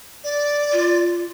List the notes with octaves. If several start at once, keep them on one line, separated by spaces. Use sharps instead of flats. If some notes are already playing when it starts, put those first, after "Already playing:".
D5
F4